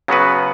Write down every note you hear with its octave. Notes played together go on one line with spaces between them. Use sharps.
C#3 F#3 B3 F#4 B4